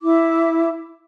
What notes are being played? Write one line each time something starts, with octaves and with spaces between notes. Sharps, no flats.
E4 D6